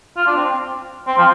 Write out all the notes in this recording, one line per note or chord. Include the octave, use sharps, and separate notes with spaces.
F4
D4
C4
C4
F3